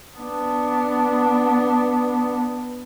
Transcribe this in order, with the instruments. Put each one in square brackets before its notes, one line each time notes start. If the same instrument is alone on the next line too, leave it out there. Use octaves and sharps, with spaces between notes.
[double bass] B3 D4